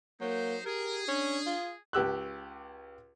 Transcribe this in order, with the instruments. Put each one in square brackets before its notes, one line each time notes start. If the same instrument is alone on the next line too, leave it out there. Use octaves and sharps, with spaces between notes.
[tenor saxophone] F#3 [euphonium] A#3 [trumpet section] D#4 C5
[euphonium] G4 [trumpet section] G#4 [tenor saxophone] A#4
[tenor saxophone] C#4 [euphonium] D4
[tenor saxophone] F4
[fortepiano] C#2 G4 E6 F#6